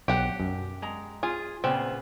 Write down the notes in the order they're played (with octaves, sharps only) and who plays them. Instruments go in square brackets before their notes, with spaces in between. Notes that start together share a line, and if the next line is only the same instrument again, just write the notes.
[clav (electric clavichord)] B1 [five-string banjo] G4 F#5
[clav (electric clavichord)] F#2
[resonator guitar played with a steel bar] G#3 A#5
[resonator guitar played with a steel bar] F4 [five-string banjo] G#4
[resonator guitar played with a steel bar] A#2 C#3 B3 [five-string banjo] C4